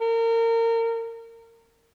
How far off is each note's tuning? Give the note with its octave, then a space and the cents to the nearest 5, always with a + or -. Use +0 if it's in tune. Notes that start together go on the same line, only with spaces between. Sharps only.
A#4 -30